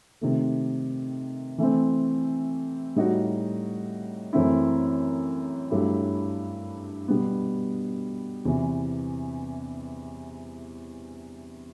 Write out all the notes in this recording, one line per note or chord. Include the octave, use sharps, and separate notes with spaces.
C3 D#3 A3
E3 A3 C4
A2 G3 D#4 F#4
F#2 E3 A3 C4 E4
G2 F#3 A3 E4 G4
B2 G3 B3
E2 C3 E3